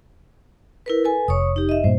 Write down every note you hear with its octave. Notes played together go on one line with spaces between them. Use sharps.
E4 A#4 B4
A4 B4 G#5
F1 C#5 C#6 D#6
D#4 G4
D#5 E5
G2 A#2 C5